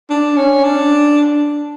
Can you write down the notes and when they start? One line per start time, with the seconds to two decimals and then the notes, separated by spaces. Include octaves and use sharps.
0.10 D4
0.37 C#4
0.64 D4